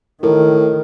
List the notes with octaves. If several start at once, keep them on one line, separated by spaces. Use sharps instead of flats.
A2 D#3 A#4